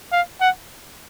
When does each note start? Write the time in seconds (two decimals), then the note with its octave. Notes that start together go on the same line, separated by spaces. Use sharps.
0.12 F5
0.41 F#5